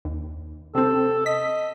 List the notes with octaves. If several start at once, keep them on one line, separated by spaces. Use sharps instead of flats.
D#2
C3 C4 A4
D#5 B6